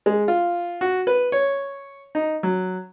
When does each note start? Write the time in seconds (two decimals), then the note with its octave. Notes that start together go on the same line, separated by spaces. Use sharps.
0.06 G#3
0.28 F4
0.81 F#4
1.07 B4
1.32 C#5
2.15 D#4
2.43 F#3